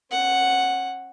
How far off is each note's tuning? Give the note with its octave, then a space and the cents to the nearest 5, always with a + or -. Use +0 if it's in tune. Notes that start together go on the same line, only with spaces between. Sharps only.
C#4 -35 F#5 +0